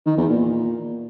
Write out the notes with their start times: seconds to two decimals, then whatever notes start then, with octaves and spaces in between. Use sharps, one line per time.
0.06 D#3
0.17 E2
0.28 A#2